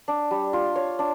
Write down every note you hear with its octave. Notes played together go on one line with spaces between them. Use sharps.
D4
G3
F4
C#5
D4